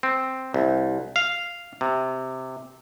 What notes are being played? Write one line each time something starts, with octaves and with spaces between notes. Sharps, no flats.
C4
C2
F5
C3